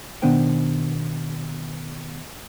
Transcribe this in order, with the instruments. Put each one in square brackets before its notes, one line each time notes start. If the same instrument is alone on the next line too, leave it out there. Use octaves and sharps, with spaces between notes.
[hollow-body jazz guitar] B2 D#3 B3 D4 C5 G5